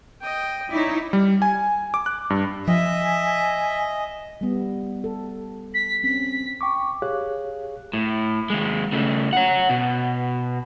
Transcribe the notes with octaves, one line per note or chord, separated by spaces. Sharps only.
D#5 G5
D#4 E4 C#5 D5
G3
G#5
D6
F#6
G2
F3 D#5 E5 G#5
G3 B3
A4
B6
C4 C#4 B6
G5 C#6 D6
G4 G#4 C#5 F5 F#6
A2
D#2 G#3
C#3 A3
C#5 F#5
B2